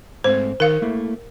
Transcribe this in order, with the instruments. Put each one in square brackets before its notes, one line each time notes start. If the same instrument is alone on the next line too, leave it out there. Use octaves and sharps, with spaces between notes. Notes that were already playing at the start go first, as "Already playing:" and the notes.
[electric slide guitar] G#2 A3 C4 [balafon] C5
[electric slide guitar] D#3 [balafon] A#4 F5
[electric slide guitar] A3 A#3 E4